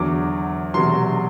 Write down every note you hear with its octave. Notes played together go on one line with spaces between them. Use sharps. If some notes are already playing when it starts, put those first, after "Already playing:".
Already playing: E2 D3 F#3 D6
E1 E2 C3 F#3 C6